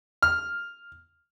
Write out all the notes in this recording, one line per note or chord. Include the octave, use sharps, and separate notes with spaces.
F6